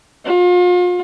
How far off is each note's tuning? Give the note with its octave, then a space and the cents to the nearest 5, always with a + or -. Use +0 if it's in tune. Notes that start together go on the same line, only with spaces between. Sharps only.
F4 +40